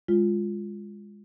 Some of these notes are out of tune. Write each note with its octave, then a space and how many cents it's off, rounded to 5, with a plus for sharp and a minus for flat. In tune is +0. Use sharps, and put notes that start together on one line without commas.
G#3 -20 F4 +0